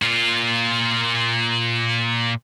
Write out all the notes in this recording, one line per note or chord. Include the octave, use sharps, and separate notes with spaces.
A#2 F4